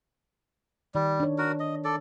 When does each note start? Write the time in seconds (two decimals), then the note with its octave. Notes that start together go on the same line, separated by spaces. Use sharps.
0.95 D#3 G3
1.20 D4 C#5
1.38 F#4 A#4
1.60 D#5
1.84 A4 D5